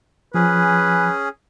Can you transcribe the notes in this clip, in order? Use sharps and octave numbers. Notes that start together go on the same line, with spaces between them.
F3 C#4 G#4 B4